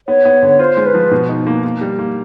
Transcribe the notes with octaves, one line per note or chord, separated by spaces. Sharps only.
B3 C#5
B3
D3
F4 C5
G#3
B4
F3
B2
D#4
A#3
A#3
G3
A#3